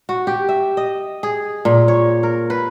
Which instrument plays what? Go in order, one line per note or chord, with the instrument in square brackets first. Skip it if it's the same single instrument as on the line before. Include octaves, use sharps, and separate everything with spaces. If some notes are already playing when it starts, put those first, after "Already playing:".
[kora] F#4
G4
E5
D#5
G#4
A#2
C#5
A#4
B4